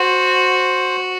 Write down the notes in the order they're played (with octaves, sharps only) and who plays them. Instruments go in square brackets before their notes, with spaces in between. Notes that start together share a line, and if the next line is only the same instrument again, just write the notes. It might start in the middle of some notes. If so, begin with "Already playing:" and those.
Already playing: [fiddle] F#4 [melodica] C5